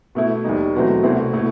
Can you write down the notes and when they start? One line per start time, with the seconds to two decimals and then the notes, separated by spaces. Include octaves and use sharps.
0.15 B2 A3 E4
0.44 D#2 D#3 G3 D#4
0.75 E2 B2 F#3 A3 C4
1.03 C2 B2 A3 C4 E4
1.33 B2 A3 E4